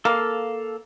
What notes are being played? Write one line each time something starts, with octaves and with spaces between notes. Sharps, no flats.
A#3 A4 F5 F6